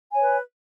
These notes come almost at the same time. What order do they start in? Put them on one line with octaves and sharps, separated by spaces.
G#5 C#5 B4